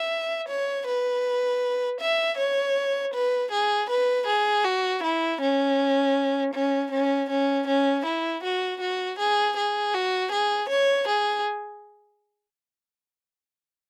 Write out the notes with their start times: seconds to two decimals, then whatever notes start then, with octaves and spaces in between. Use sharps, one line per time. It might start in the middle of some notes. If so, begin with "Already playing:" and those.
Already playing: E5
0.49 C#5
0.87 B4
2.01 E5
2.38 C#5
3.14 B4
3.52 G#4
3.90 B4
4.27 G#4
4.64 F#4
5.03 E4
5.41 C#4
6.54 C#4
6.91 C#4
7.30 C#4
7.67 C#4
8.06 E4
8.44 F#4
8.81 F#4
9.19 G#4
9.57 G#4
9.94 F#4
10.32 G#4
10.70 C#5
11.08 G#4